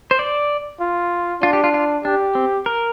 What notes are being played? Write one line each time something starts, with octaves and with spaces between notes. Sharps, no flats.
C5
D5
F4
D4 F4
G4
F4
F4
D4 G4
C4
A#4